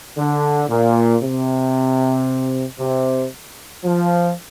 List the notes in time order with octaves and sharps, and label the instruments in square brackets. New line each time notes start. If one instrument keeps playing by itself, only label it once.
[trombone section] D3
A#2
C3
C3
F3